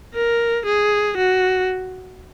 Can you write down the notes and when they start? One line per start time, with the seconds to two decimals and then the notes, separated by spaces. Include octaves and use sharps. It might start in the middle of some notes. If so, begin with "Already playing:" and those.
0.14 A#4
0.66 G#4
1.17 F#4